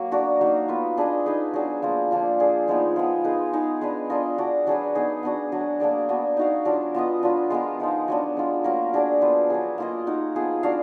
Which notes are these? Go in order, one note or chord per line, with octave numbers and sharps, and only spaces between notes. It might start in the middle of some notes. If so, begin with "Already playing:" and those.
Already playing: F#3 A#3
D4 F#4 A#4 D5
F#3 A#3 D#4
B3 F4 B4
D4 G#4 B4 D#5
D#4 G#4 B4
F#3 D4 G#4
F3 A#3 F4
F3 A#3 D4 F4
D4 G#4 D5
F3 G#3 B3 D#4
F3 G#3 B3
D#4 G#4 B4
G#3 D#4 G#4
G#3 D4 G#4 B4
D4 F4 A#4 D#5
D4 F#4 D5
F#3 D4 G#4 B4
B3 D#4 G#4
B3 D4 F#4
F#3 D4 G#4
A#3 D4 G#4 D5
B3 D4 F#4 D5
D#4 F#4 D5 F5
F#3 D4 F4 A#4
B3 F4 B4 D#5
F#3 D4 F4 B4
G#3 B3 F4 A#4
F3 G#3 D#4
F#3 B3 D4
G#3 D4 F4
F#3 A#3 F4 A#4
F#3 D4 G#4 D5
F3 B3 F4 B4
F#3 D4 G#4
A#3 F4 A#4 D#5
D#4 F#4 A#4
F3 B3 F4 G#4
D4 F#4 D5 F5